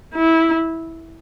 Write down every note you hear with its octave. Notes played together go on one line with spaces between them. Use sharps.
E4